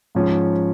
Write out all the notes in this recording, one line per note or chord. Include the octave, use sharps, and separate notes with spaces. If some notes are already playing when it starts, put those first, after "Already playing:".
G#2 F3 C#4